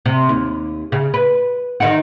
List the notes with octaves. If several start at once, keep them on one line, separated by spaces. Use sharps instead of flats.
C3
D#2
C#3
B4
D#3 D#4 F#4